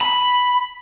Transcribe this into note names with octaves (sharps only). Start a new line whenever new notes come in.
B5